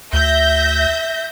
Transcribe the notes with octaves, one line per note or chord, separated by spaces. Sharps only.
D2 E5 G6 A#6